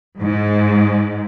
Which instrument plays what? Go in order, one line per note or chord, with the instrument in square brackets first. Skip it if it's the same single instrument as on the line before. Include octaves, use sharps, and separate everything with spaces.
[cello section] G#2